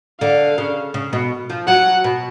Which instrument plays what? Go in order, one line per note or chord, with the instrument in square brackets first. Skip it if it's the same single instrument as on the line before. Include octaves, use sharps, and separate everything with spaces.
[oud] D3 [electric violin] F5
[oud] C#3
C#3
B2
F3
[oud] F#3 [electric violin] F#5
[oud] B2